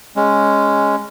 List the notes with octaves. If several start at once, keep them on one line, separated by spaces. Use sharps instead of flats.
G#3 C#4